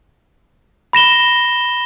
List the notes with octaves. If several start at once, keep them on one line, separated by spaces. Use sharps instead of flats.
B5 A#6 E7 G7